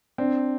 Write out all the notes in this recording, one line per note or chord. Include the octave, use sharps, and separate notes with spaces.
C4 D4